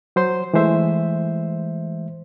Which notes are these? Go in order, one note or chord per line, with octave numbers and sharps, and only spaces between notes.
F#3 C5 C6
E3 G#3 A3 C5 E5